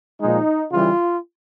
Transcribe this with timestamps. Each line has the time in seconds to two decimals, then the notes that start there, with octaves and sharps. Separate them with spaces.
0.20 A#2 F3 G#3 D#4
0.71 C#3 E3 G3 F4